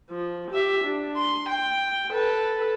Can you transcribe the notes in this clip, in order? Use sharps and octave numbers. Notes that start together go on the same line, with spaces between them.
F3
G4 E5
D4
C6
G5
A4 B4